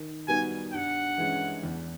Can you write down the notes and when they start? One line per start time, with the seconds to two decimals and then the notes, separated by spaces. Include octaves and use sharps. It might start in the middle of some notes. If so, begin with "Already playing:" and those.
Already playing: D#3
0.28 G3 B3 D#4 F#4 G#5
0.73 G2 F#5
1.18 E3 G#3 C#4
1.63 E2